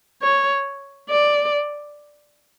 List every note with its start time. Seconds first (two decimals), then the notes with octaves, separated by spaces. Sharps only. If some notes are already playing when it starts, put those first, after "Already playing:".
0.22 C#5
1.10 D5